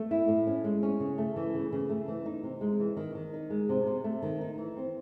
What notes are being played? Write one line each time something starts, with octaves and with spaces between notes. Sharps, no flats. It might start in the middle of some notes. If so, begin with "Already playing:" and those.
Already playing: A3
E4
A2
C#4
G#3
C#4
C#3
A3
E3
C#3
C#3
A3
E3
D#4
C3
G#3
E3
D#3
D#3
D#4
G#3
C3
C3
A3
D#3
D#4
E3
C4